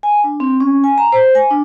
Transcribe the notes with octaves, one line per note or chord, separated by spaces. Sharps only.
G#5
D4
C4
C#4
G#5
A#5
C5
G#5
D4